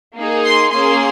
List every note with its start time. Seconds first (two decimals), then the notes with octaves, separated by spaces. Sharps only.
0.15 A#3 D#4 G#4
0.44 C6
0.72 A#3 C#4 G#4 C6